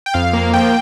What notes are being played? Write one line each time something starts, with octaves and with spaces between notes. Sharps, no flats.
G5
F2 F5
A#3
F3 G5